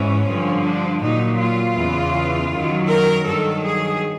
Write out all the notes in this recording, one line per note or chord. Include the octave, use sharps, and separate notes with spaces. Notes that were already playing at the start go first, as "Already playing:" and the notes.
Already playing: G#2 E3 C#4
G2 D3 F3
D4
A#2 F#3 D#4
F4
E2 C#3 E3
F#2 D#3 F#3
A#4
G2 D#3 F#3 A4
G#4